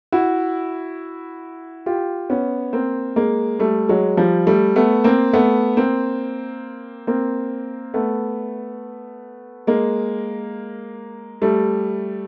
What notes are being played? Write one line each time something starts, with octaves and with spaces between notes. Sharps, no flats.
E4 F#4
F4 G4
B3 C#4
A#3 C4
G#3 A#3
G3 A3
F#3 G#3
F3 G3
G3 A3
A3 B3
A#3 C4
A3 B3
A#3 C4
A#3 C4
A3 B3
G#3 A#3
G3 A3